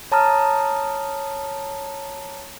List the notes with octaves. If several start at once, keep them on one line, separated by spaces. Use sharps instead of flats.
C#5 A5 A#5 D#6 F6